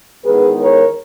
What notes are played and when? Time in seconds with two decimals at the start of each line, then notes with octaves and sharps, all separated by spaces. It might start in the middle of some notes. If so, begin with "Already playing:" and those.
0.24 E2 D#3 G#3 B3 G#4 B4
0.60 A#4 C#5